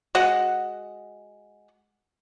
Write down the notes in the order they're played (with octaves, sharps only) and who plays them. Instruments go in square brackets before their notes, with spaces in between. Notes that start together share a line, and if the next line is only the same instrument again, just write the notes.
[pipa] G#3 F#4 F#5